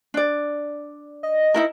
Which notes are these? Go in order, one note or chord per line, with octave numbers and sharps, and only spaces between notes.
D4 D5
D#5
D#4 E4 A#4